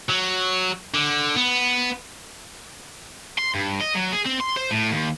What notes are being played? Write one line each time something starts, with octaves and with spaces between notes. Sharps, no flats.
F#3
D3
B3
C6
G2
D#5
F#3
G#4
C4
C6
C5
A2
D#2